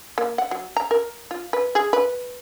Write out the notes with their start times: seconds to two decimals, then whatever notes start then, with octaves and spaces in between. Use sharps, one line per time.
0.18 A#3
0.38 F#5
0.51 F#3
0.77 A#5
0.91 A#4
1.31 F4
1.53 B4
1.75 G#4
1.93 B4